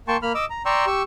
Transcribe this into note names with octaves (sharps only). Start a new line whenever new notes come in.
A#3 G5 A5 C6 C#6
A#3 B5 F6
D#5 D6 E6
A#5
D5 G5 A#5 C6 C#6 E6
G4 C#6 E6